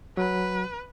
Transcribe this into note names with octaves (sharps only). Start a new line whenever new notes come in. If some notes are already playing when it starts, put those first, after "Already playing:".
F#3 B4